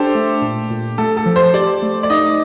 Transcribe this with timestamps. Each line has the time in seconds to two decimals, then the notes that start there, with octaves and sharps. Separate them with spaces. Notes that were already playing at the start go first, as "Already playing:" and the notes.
Already playing: D4 G4 A4 C5
0.15 A3
0.42 A#2
0.70 A#2
0.98 A3 A4
1.17 A4
1.26 F3
1.36 C5
1.54 G4 D5
1.82 A3
2.03 D5
2.10 D#4 D#5